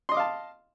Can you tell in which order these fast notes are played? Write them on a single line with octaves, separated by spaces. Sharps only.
C6 D#5 D6 F5 A5